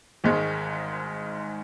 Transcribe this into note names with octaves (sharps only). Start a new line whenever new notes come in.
G#1 G#2 D#3 G#3